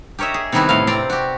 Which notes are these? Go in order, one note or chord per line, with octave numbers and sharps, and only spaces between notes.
G4 A#4 C#5 D#5 E5
G#4
C3 D#3 G3 B3 E4 F#4
A2 F5
C4 C5 D5 G5 A#5 C6
F#4 G4